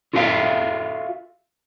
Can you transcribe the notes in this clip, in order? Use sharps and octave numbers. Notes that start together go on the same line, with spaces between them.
F4 F#4 A4 E5 F5 G5